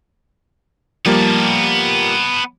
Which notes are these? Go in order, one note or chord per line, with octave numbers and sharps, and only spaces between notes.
F3 G3 A#3 B3 A5